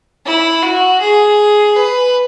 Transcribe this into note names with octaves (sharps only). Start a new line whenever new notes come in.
E4
F#4
G#4
B4